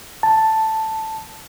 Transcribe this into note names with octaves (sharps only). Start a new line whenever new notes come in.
A5